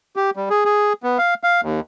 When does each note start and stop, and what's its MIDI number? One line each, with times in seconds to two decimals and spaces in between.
0.16 0.30 67
0.36 0.49 55
0.50 0.64 68
0.65 0.93 68
1.03 1.18 59
1.18 1.34 77
1.43 1.61 77
1.63 1.80 39